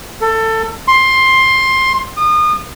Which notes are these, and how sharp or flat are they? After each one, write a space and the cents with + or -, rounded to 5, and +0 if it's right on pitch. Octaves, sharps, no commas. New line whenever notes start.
A4 +20
C6 +15
D#6 -35